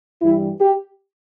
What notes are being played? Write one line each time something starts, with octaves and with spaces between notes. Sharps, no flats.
G2 E3 G3 E4
G4